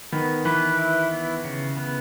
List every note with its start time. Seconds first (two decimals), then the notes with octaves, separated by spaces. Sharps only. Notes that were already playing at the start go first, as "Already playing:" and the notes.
0.12 D#3 B3
0.45 E3 B4
0.79 E4
1.11 B3
1.44 C#3
1.77 B3